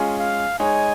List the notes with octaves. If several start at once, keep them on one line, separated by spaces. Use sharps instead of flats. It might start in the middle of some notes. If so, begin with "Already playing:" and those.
Already playing: G#3 C#4 F4 G#4
F5
G#3 D#4 C#5 G#5